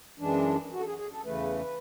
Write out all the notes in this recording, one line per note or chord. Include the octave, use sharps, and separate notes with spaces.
F#2 E3 G#3 D4
F#4
A4
G#4
G#4
A4
E2 C#3 E3 A3 B4